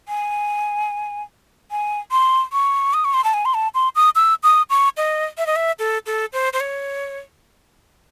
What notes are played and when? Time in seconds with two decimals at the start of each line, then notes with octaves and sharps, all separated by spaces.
0.08 G#5
1.71 G#5
2.11 C6
2.53 C#6
2.94 D#6
3.05 C#6
3.14 C6
3.24 A5
3.34 G#5
3.45 C6
3.54 A5
3.74 C6
3.96 D#6
4.15 E6
4.43 D#6
4.70 C#6
4.97 D#5
5.38 E5
5.46 D#5
5.56 E5
5.79 A4
6.06 A4
6.33 C5
6.53 C5
6.60 C#5